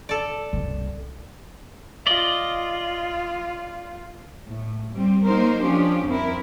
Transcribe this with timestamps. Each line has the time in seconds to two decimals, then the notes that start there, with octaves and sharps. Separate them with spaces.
0.09 A4 D5
0.53 F#1 C2
2.07 F4 D5 D#5
4.47 A2
4.93 G3 C4
5.24 F#3 A#3 D#4 A#4 C5
5.62 F3 C#4 D4 G4
6.05 F2 C4 E4 A#4